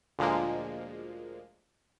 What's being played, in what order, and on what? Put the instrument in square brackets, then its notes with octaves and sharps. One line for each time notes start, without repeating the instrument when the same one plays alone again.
[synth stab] D2 A#2 F3 G#3 A#3